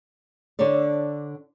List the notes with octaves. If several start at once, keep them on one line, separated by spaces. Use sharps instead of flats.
D3 D4 A4 C#5 D5